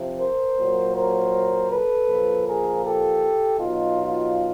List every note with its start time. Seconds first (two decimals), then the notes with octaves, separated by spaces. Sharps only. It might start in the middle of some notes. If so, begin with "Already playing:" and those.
Already playing: C3 F3
0.19 A#4 C5
0.57 A#2 F#3
0.94 A#4 C5
1.70 A4 B4
2.08 A#2 F3
2.46 G#4 A#4
2.84 G4 A4
3.60 B2 F#3 D#4 F4